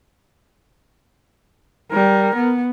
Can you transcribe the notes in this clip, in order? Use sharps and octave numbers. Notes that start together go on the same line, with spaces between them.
G3 A#4
B3